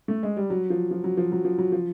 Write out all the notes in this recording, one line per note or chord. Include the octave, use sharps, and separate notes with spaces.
A3
G#3
G3
F#3
F3
F3
F#3
F3
F#3
F3
F#3
F3